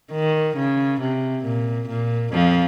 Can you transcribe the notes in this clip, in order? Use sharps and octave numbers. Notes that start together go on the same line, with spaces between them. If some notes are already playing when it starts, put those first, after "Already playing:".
D#3
C#3
C3
A#2
A#2
F2 F3